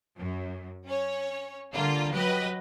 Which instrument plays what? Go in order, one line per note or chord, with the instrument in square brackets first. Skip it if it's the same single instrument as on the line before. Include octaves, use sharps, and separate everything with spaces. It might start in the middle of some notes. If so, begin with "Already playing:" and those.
[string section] F#2
C#4 C#5
[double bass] D3 [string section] G3 A#3 F4
[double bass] F#3 [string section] G4 B4 D#5